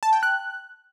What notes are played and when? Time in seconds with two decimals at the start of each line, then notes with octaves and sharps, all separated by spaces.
0.03 A5
0.13 G5
0.23 F#6